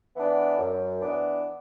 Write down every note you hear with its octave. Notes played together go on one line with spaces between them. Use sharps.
E3 B3 D4
F#2
E3 B3 D4